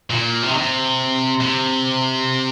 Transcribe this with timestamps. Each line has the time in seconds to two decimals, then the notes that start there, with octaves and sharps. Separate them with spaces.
0.10 A#2
0.43 C3
0.51 D#3
0.58 C3
1.41 C3